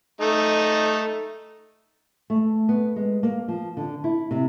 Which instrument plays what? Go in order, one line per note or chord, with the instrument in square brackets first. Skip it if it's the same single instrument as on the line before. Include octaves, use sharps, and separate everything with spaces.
[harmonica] A3 D#4
[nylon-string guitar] A3
B3
G#3
A#3
F3
D3
E4
C3